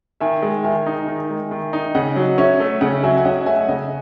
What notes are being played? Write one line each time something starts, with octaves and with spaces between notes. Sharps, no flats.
D#3 E5 G#5
G#3
D#3 E5 G#5
D#4
D#3
G#3
D#3
D#4
C#3 D#5 F#5
F#3
C#4 C#5 E5
A3
C#3 D#5 F#5
F#3 E5 G#5
G#5
C#4 D#5 F#5
A3 E5 G#5
C#3 D#5 F#5